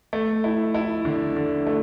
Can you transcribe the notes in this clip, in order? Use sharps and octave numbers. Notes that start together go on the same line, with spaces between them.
A3
E4
E4
D3
D3
A3